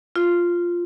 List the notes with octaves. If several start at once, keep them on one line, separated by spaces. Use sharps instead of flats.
F4